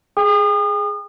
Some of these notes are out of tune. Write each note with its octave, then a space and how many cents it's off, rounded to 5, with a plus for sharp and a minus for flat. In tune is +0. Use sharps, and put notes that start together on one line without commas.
G#4 +5 G5 +40 D#6 -35